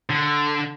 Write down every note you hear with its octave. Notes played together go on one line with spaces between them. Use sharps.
D3